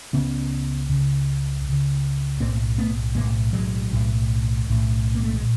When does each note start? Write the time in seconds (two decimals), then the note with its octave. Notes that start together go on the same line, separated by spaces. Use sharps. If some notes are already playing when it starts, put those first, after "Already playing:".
0.13 C#2 C#3 B3 C#4
0.89 C#2 C#3
1.64 C#2 C#3
2.40 B1 A2 A#3 C4
2.78 A3 B3
3.15 B1 A2 G#3 A#3
3.53 F#3 G#3
3.91 B1 A2
4.67 B1 A2
5.15 A#3
5.23 A3
5.34 G#3
5.42 A#2